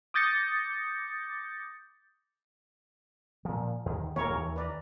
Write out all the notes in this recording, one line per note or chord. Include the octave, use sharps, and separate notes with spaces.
D6 D#6 G6 A6 A#6 C#7
A#2 F3
D#2 D#3
D#1 D#3 A#3 A#4 C#5
D#2 E3
B4 D5 A#5